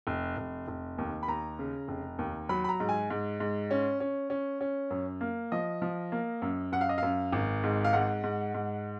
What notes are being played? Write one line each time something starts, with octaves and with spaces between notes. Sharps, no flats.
F1
F1
F1
D#2
B5
D#2 A#5
C#3
F1
D#2
F#3 B5
B5
A#5
G#2
G#5
G#2
G#2
C#4
C#4
C#4
C#4
F#2
A#3
F3 D#5
F3
A#3
F#2
F#2 F#5
F5
D#5
F#2 F5
G#1
G#2
F5
G#2 F#5
G#2
G#2